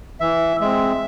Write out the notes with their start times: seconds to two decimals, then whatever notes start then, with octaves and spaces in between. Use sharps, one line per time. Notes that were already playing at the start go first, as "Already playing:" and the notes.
0.20 E3 E5
0.60 G#3 C4 E5